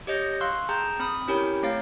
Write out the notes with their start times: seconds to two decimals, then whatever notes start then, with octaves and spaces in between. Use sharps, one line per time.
0.07 G4 C#5 D#5 G6 A#6 C#7
0.40 F5 C6 C#6 E6 F#6
0.69 G#4 G5 A5 A#5 G6
0.99 C4 B5 D#6
1.28 C#4 E4 G4 A#4 C#5 G5
1.63 A3 C4 C#5 F5 G5 A6